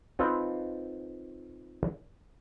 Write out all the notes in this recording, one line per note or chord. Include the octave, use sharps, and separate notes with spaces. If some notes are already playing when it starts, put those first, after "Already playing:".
C4 D#4 F4 A4 B4